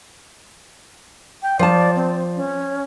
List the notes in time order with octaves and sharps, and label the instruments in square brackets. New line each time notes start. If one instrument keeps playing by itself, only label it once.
[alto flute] G5
[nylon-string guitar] F3 A5 [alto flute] D5
[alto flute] C4
C#4